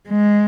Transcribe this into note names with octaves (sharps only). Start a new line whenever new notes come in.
G#3